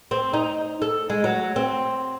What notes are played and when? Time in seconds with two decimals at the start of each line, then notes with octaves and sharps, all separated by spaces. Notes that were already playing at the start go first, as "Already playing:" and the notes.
0.11 C4
0.33 D#4
0.82 A4
1.10 G#3
1.24 F#3
1.56 C4